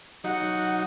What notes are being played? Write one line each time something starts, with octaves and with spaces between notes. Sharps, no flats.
F#3 D#4 F#4 F#5